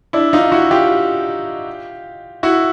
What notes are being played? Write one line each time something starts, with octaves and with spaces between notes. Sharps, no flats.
D4 E4
D#4 F4
E4 F#4
F4 G4
E4 F#4